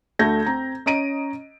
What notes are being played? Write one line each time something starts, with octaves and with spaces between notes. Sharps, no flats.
D2 A3 G6 G#6 A#6
C4 A#5
C#4 D#5 A#5 D7 D#7